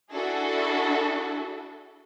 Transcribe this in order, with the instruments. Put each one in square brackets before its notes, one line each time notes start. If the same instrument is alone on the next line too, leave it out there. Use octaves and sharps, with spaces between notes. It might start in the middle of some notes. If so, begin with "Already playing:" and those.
[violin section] D4 E4 F#4 G#4 A4